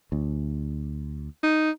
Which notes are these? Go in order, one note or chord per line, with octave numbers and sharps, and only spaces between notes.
D2
D#4